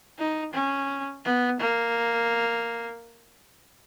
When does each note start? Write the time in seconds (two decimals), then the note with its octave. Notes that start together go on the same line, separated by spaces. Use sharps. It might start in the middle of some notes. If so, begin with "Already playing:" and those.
0.18 D#4
0.54 C#4
1.25 B3
1.60 A#3